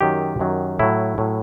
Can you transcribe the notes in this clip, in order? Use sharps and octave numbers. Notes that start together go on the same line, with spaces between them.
F#2 D#3 F#3 G4
F#2 D#3 F#3
A2 F#3 E4
A2 F#3